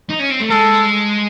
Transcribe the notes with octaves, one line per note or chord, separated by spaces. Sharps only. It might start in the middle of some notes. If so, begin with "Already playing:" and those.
D#4
C#4
C4
A3
G#3 A4